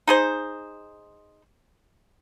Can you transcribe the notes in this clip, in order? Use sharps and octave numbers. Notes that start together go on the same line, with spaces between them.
D#4 G#4 C5